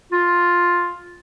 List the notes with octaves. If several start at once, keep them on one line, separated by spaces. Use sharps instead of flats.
F4